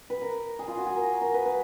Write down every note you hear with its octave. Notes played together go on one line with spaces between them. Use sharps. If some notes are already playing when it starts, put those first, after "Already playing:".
B4
A#4
G#4
F4
F#4
G#4
A#4
A#4
B4
B4